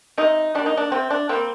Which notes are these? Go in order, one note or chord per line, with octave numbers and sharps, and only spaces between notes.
C3 D#4
G3 A#3 D4
D#4
D4
C3 C4
D4
G3 A#3 C4